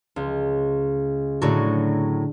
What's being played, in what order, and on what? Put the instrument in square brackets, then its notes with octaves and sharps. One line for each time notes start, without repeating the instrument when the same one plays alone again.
[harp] C#2
[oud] A2 F#3 [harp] D3